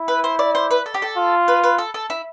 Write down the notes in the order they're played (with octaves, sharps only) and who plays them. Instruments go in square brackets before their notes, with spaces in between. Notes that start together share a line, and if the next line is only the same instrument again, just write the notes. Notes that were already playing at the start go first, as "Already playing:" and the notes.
Already playing: [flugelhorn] E4
[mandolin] B4
C5
D5
C5
B4
A4
G4
A4
[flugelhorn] F4
[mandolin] B4
B4
A4
A4
E4